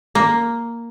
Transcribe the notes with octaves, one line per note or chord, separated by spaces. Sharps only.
A#3